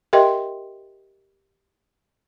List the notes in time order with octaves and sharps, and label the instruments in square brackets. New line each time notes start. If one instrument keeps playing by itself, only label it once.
[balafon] G4 A#4 D#5 E5 G5 C6